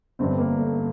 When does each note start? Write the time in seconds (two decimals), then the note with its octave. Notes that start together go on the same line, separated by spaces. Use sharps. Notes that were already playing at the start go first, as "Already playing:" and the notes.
0.19 G1 G2 D3 C4
0.38 A#3
0.59 A3